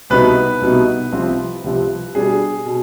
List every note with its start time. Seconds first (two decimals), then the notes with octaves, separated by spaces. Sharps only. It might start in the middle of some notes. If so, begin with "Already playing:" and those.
0.10 C2 B2 B3 D#4 B4
0.61 C2 B2 B3 D#4
1.12 C2 C3 F3 C4
1.64 C2 C3 F3 C4
2.15 B2 G3 D4 G#4
2.66 B2